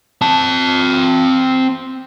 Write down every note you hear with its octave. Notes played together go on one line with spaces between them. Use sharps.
C4 A5